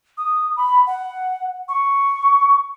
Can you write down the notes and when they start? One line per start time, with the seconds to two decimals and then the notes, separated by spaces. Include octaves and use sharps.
0.18 D#6
0.57 B5
0.87 F#5
1.69 C#6